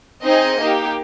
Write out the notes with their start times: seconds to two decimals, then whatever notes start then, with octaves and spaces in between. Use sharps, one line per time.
0.23 C4 D#4 G#4 D#5
0.59 A#3 D#4 G4